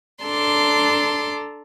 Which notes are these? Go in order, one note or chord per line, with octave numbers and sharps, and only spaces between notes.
D4 A4 A#5 C6 D6